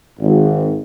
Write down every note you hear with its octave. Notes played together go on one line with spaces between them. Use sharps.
G#1